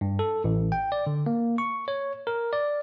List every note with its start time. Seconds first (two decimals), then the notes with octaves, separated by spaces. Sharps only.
0.01 G2
0.19 A4
0.44 A1
0.72 G5
0.92 D5
1.07 D3
1.26 A#3
1.58 C#6
1.88 C#5
2.27 A#4
2.53 D5